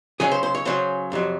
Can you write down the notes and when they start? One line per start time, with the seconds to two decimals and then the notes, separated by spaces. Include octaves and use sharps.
0.20 C#3 F#3 C#4 G#4
0.31 C5
0.43 C5
0.55 C#5
0.65 C#3 F#3 C#4 C5
1.12 F2 C3 F#3